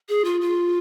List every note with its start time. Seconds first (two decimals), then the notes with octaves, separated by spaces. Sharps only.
0.09 G#4
0.25 F4
0.41 F4